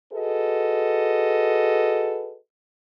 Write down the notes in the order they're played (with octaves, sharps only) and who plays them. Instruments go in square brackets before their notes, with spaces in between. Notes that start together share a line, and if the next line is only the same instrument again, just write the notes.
[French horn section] F#4 G#4 A4 B4 D#5